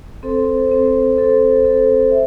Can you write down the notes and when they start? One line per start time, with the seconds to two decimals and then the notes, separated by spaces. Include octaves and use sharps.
0.23 C4 A4 C5
0.70 C4 A4 C5
1.17 C4 A4 C5
1.64 C4 A4 C5
2.11 E5